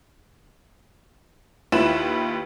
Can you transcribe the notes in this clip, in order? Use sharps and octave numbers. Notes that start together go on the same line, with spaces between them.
D#2 E4 F4 B4 B5 E7